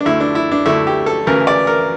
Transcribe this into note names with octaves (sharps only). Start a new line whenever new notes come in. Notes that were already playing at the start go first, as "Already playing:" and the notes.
D4
D2 D3 A3 E4
D4
E4
D4
D2 D3 A3 E4
G4
A4
D2 C#3 E3 A#4
D5
A#4